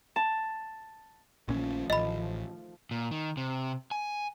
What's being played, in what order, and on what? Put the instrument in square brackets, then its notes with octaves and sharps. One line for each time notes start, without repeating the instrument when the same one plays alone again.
[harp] A5
[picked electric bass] A#1 A#2 C#4 [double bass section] D#3 F3 A3
[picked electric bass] A1 [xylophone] D#5 B5
[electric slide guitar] A#2
D#3
C3
G#5